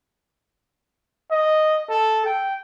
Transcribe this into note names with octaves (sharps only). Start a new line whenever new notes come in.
D#5
A4
G5